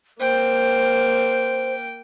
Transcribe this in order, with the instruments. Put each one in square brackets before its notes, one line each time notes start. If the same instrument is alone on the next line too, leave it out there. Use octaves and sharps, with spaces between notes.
[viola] A#3 [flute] C5 [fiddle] G5